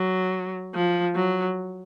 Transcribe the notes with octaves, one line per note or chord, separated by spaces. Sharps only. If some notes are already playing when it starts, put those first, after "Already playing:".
Already playing: F#3
F3
F#3